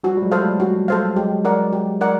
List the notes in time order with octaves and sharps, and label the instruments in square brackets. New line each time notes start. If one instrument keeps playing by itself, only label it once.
[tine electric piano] F3 G3 [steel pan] F#4
[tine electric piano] G3
F#3 G#3
[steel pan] A4 C5 F5
[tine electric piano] G3 A3
[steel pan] F#4
A4 C5 F5
[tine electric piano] F#3 G#3 [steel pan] G4
[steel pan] A#4 D5 F#5
G4
A#4 D5 F#5